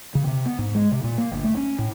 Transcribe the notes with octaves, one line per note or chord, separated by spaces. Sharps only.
C#3
C3
B3
G#2
G#3
C3
A#2
A#3
G1
A3
C#4
A2